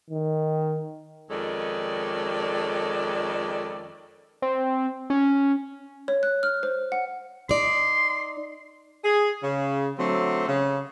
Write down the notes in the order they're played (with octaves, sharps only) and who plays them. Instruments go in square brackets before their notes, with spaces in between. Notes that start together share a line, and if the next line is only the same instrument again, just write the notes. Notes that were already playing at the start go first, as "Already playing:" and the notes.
[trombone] D#3
[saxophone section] F2 D#3 G#3 C#4 A4 D5
[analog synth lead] C4
C#4
[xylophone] C#5
F#6
F6
C5
F#5
[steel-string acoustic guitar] D#4 D5 [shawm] C6
[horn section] G#4
C#3
D3 F#3 A3 C4
C#3